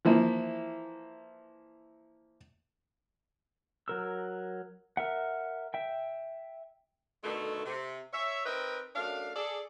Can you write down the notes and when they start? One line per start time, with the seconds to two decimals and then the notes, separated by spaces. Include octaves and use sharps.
0.05 E3 F3 A#3 E4
3.88 F#3 A#4 E6
4.97 A#4 E5 F#5
5.74 E5 G5
7.23 B2 D3 D#3 A3
7.65 C3
8.13 C#5 E5
8.46 C4 D#4 A#4 B4 D#5 G5
8.95 F#2 A3 D4 F5
9.35 G#4 A4 D5